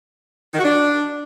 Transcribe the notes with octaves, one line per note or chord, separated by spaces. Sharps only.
D#3
F#4
D4